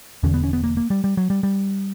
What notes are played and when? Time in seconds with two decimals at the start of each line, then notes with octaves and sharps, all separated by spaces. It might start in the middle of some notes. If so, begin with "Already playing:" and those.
0.23 E1 E2 D3 C#4
0.34 B3
0.44 C#4
0.53 B3
0.64 A#3
0.77 A#3
0.90 G3
1.04 G3
1.17 F#3
1.30 G3
1.43 G3